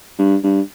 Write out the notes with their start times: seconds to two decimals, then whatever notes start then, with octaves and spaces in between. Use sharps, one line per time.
0.19 G2
0.43 G2